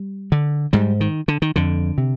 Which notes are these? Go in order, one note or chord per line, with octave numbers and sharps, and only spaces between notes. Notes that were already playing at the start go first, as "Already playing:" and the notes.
Already playing: G3
D3
G#2 G3
D#3
D3
D#3
F2 D3
C3